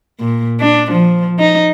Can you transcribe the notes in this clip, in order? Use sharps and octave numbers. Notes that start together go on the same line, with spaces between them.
A#2
D4
F3
D#4